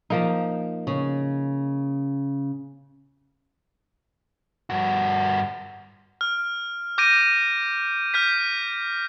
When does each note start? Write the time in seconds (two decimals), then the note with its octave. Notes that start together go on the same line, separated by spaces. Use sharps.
0.10 F3 A#3 D#4
0.87 C#3
4.70 G2 F#4
6.21 F6
6.98 D6 G6 A#6 D7 D#7
8.14 F6 G6 B6